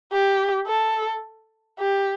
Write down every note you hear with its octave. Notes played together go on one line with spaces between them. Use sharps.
G4
A4
G4